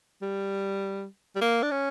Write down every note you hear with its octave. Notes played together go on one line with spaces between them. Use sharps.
G3
G3
A#3
D4
C#4